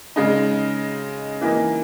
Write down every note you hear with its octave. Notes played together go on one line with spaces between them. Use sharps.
C#3 G#3 D#4
E3 A#3 D#4